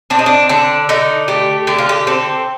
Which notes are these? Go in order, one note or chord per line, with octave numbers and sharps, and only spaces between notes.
C4 D4
D#4
D4
D3 D4
D3 D#4
A3 G4
D3 G4
F4
G4
C4 A4